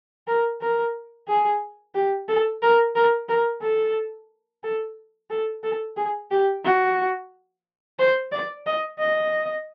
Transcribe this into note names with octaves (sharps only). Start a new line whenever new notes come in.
A#4
A#4
G#4
G4
A4
A#4
A#4
A#4
A4
A4
A4
A4
G#4
G4
F#4
C5
D5
D#5
D#5